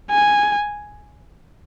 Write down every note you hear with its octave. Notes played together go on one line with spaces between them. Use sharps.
G#5